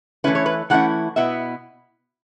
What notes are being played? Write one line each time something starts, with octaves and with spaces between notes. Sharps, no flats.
E3 A3 C#4 E4 B4
C#5
B4
E3 A3 C#4 E4 F#5
B2 B3 E4 E5